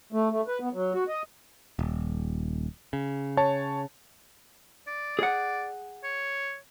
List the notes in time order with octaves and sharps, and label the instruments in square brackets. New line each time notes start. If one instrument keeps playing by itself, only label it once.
[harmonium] A3
A3
B4
B3
F#3
F#4
D#5
[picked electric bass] D#1
C#3
[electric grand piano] C#5 A5
[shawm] D5
[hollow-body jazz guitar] G#4 F#5
[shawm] C#5